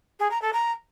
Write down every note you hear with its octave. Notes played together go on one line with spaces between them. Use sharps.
G#4
A#5
A4
A#5